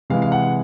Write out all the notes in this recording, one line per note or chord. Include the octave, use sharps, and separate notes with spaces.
C3 E3 G#3 F5
F5
F#5